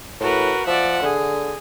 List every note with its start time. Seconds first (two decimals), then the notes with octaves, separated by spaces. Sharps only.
0.21 A2 F#4 A#4 B4
0.67 F3 D5 E5 F#5
1.02 D3 G#4